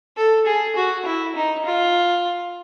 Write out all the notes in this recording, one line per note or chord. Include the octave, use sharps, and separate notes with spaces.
A4
G#4
F#4
E4
D#4
F4